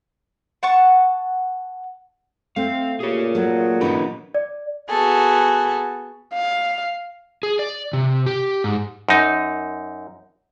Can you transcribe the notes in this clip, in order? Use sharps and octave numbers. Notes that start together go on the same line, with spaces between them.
F#5 A5 C#6
A3 C4 F5
A#2 G4 G#4 C#5
F#3 A3
D3 C#4 D#4 G4 B4
D5
B3 F#4 G#4 A4
F5
G#4
D5
C3
G4
G#2
F#2 D#4